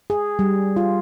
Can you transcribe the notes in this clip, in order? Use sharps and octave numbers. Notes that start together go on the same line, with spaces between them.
G#4
G3
F4